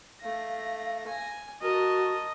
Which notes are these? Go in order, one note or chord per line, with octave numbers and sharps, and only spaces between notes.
A3 F5 A#6
G#5
F#4 A#4 D#5 A5